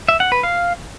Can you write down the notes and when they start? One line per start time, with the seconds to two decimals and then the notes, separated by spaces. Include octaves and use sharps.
0.08 E5
0.20 F#5
0.32 B4
0.43 F5